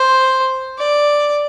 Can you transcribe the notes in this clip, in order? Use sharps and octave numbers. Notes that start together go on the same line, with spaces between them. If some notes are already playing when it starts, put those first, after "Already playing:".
Already playing: C5
D5